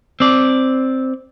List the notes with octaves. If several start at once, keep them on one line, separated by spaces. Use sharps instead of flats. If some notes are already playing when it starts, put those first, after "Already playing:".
C4 D5